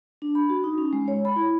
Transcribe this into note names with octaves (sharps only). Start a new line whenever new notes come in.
D4
B5
F#4
D#4
C#4
G#3
C#5
B5
E4